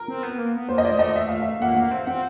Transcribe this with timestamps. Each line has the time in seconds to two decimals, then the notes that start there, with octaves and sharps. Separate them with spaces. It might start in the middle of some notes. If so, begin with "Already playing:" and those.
Already playing: A#4
0.08 C4
0.23 B3
0.38 A#3
0.54 B3
0.69 A#3 C5
0.78 D#5
0.85 D5
0.92 A3
0.99 D#5
1.16 E5
1.29 F5
1.42 E5
1.61 A#3 F#5
1.69 F5
1.76 A#3 F#5
1.91 C4
2.07 C4 F#5